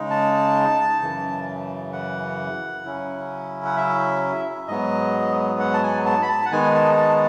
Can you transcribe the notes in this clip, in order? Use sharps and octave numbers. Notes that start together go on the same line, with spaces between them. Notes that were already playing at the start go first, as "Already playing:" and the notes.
Already playing: C#3 G#3 D#4
A5
F#2 C#3 E3
F#5
C#3 F#3 C#4 E4
F#5
E5
G#2 F#3 B3 D#5
F#5
A5
G#5
A5
B5
A5
F#5
D#3 G#3 B3 D#4 G#5
A5
A5